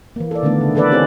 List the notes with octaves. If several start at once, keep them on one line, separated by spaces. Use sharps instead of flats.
E3 A#3
A4 D5
D3 D#3 A3 B3 D4
C#3
E3 A#3 A4 B4 D5
C4 D#4 G4 G#4 C5 C#5